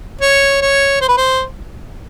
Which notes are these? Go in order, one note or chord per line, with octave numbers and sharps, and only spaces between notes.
C#5
C#5
C5
B4
C5